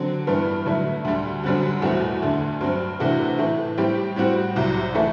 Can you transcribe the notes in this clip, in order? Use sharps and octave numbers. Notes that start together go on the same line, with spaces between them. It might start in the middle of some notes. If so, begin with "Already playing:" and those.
Already playing: D3 F#3 C4
G2 E3 G3 B3
D3 F#3 A3 E4
D2 D3 G3
F#2 D3 G3 C4 F#4
E2 B2 A3 C4 F#4
D2 D3 A3
G2 F#3 C4
C3 E3 A3 D4 F#4
A2 E3 A3
A2 G3 C4 G4
A2 G3 C4 F#4
C2 C3 F#3
A2 E3 A3 E4 A4